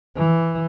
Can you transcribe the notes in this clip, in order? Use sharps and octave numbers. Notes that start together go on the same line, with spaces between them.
E3